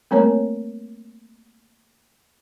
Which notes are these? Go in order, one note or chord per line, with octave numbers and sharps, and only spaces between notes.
G3 A3 A#3 C4 A#4 C#5